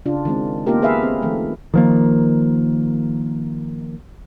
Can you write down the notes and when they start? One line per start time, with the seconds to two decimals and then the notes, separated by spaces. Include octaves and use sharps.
0.06 C#3 D4 F4
0.25 D#3 G#3 C4
0.67 A#3 B3 D#4 F4 G4 A#4
0.82 G#4 B4 E5 F5
1.03 C4
1.22 D#3 F3 A3
1.74 D#3 F3 A#3